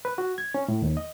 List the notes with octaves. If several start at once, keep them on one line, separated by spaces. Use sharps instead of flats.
B4
F#4
G#6
C#4
A2
D#2
D#5